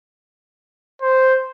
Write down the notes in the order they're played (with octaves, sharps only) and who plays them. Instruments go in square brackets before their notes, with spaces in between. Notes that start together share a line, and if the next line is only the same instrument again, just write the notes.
[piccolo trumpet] C5